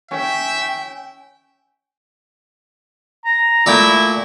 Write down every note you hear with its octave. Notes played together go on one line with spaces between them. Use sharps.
C#4 E5 G5
A#5
A#2 A3 E4 G5